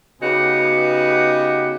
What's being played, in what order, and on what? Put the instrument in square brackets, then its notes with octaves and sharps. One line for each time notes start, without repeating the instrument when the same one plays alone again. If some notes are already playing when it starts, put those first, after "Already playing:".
[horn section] C#3 B3 D#4 F#4 G4 B4